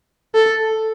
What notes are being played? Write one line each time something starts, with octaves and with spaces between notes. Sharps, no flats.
A4